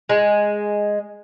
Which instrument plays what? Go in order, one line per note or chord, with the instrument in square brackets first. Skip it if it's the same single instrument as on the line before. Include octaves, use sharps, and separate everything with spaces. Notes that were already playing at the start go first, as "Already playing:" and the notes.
[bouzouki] G#3